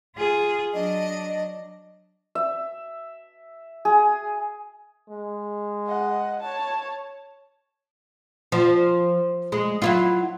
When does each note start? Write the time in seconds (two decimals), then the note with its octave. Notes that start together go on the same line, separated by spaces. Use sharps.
0.17 F4 G#4
0.74 F#3 D4 D#5
2.35 E5
3.85 G#4
5.09 G#3
5.87 D#5 F#5
6.40 C#5 A5
8.52 F3
9.52 G#3
9.82 F#3 E4 F4